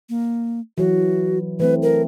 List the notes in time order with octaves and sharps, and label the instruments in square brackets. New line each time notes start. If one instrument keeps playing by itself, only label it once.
[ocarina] A#3
[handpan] E3 F#3 [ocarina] F#4
[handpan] E3 A3 C4 [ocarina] B4
[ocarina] A#4